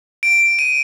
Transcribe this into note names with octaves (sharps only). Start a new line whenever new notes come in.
D7
D#7